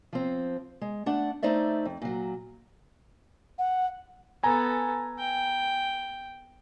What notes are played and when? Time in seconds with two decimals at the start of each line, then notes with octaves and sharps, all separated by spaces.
0.13 F3 C4
0.81 G#3
1.06 A3 D4 F#5
1.43 A3 D#4 C5 D5 E5
1.85 F2
2.02 A#2 F#3
3.58 F#5
4.43 B3 A4 G#5 A#5
5.19 G5